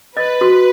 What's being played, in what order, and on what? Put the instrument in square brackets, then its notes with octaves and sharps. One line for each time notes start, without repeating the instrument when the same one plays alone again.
[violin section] B4 [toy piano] D#5
[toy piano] F#4